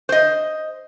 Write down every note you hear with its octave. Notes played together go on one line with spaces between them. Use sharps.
C5 D#5